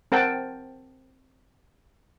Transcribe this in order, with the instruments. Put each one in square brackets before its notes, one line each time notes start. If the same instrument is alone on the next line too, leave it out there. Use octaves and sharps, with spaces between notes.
[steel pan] C4 A#4 F#5 G5 A5